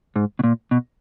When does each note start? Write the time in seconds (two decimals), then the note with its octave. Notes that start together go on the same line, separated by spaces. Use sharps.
0.16 G#2
0.39 B2
0.44 A#2
0.71 B2